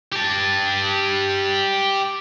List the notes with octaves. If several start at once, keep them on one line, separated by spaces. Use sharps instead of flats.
G4 A5